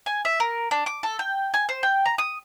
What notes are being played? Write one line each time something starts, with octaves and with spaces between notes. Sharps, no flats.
G#5
E5
A#4
D4
D6
A4
G5
G#5
C5
G5
A#5
D#6